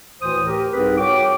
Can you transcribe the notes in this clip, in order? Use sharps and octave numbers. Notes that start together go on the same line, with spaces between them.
D2 A2 E3 C5 D#6
G4 A#4
C2 G#2 C4 G#4 A#4 B4
F#4 C#5 G5 D6